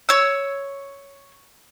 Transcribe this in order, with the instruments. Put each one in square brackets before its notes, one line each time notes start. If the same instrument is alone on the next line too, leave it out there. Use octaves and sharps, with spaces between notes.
[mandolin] C#5 E6